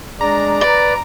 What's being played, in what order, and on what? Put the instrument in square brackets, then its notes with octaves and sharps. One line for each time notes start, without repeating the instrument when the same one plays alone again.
[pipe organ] G#3 D4 D5 [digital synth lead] A#5
[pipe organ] B4 [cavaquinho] D5